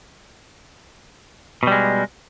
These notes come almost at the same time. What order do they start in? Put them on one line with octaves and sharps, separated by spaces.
B2 G3 G#3